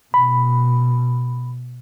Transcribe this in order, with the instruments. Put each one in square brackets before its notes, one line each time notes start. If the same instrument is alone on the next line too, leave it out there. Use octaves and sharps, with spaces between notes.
[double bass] B2 [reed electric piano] B5